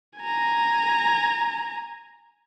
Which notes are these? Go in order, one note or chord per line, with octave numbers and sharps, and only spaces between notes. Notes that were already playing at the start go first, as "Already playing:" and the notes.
G#5 A#5